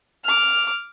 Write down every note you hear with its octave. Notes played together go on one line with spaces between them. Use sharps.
D6 F6